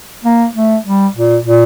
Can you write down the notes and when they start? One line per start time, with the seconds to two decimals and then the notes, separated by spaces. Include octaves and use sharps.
0.24 A#3
0.55 A3
0.86 G3
1.16 A#2
1.45 A#2